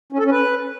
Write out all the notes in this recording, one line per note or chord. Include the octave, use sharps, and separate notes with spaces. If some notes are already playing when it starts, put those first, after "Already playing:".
C#4
A4
C#4
B4